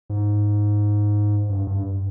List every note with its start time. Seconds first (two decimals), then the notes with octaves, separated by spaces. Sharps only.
0.10 G#2
1.50 G2
1.67 G2